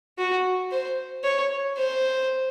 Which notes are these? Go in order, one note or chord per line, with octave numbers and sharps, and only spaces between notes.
F#4
C5
C#5
C5